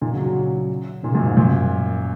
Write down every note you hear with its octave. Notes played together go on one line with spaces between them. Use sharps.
A#2 D#3
C#3 F#3
C#3 F#3
A#2 D#3
C#3
F#2 A#2
G#2
F#2 A#2